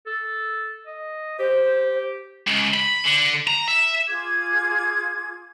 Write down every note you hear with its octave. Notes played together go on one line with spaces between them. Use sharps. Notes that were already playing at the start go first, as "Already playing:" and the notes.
A4
D#5
G4 C5
C#2
B5
D3
A#5
E5
F4 G#4 D6 G#6